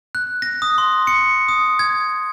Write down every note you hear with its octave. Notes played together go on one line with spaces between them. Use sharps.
F#6
A#6
D#6
C6
C#7
D#6
G#6